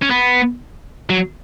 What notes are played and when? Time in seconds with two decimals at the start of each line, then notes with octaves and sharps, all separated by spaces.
0.02 C#4
0.11 B3
1.10 F#3